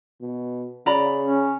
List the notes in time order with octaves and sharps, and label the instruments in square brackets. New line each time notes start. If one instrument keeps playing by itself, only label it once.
[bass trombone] B2
[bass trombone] C#3 [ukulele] D5 A#5 B5
[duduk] C#4